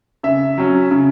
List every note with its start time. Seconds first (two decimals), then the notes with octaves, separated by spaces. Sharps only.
0.23 C#3 E5
0.58 F#3 C#4
0.91 C#3